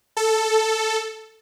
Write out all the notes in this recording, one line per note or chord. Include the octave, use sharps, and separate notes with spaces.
A4